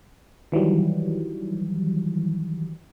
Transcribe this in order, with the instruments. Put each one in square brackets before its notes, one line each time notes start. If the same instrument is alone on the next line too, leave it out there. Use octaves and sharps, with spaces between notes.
[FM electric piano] D#3 E3 F#3 G3